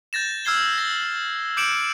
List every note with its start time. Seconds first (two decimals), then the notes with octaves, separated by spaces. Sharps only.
0.13 G6 A6 A#6 E7
0.45 E6 F6 G#6 C7 G7
0.74 G6 A#6
1.57 D6 G6 C#7 D7 E7 F#7